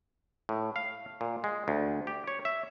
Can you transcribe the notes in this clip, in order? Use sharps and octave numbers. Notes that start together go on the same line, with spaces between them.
A2
F5
A#2
G#3
D2
G4
C#5
E5